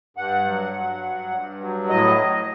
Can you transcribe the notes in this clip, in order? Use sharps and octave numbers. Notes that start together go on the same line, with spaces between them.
G2 F#5
F#3
F#3
G2
G2
F#3
A2 D#5
F#3